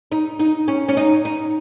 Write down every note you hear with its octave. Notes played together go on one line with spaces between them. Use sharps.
D#4
D#4
C#4
C#4
D#4
D#4